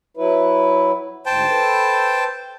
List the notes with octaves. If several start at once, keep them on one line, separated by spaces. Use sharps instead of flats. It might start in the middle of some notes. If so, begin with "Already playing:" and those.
F#3 E4 B4
D2 G#2 C5 G5 A5
A4 B4